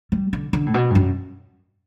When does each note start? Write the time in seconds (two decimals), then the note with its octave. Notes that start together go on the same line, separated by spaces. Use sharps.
0.12 G3
0.33 D3
0.53 D3
0.66 A2
0.74 B2
0.90 G2
0.95 F#2